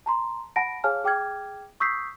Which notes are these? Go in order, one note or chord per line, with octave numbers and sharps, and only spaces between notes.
A5 A#5 C6
F#5 A5 B5 A#6 D7
G#4 C#5 F5 G#5 A5 F6
G#4 G5 D6 F6 G#6
C#6 D#6 E6 G6 B6 C7